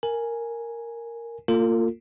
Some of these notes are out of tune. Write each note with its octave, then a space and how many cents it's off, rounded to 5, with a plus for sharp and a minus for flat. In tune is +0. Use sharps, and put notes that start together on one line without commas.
A#4 -5 G#5 +0
A#3 -20 F4 +0 A4 +45